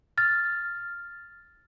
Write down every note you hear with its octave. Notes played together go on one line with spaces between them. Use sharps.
F6 A6